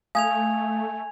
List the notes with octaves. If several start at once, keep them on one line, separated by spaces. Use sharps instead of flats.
A3 F5 G#5 D#6 G#6 F7